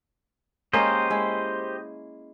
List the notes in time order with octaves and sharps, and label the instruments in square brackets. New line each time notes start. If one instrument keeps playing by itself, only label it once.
[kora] G#3 A#3 C#4 [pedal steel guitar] G4 C5 D#5
[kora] G#3 E4